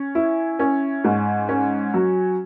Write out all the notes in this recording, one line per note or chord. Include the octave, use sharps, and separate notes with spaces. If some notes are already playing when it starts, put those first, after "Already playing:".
Already playing: C#4
E4
C#4
G#2
C#4
F#3